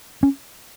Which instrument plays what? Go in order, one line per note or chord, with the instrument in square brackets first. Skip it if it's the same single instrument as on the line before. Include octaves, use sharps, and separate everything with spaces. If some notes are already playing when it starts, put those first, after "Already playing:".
[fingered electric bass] C#4